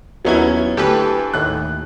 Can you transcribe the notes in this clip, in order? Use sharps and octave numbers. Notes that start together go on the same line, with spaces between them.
D#2 F#3 B3 C#4 E4 G#6
D2 G4 A4 B4
D#2 A2 F#6